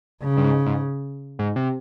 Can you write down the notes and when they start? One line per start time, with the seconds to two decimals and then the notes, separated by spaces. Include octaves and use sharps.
0.22 C#3
0.37 G2
0.44 G#2
0.66 G#2
1.39 G#2
1.56 C3